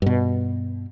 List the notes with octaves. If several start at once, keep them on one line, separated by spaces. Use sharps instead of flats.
G2 B2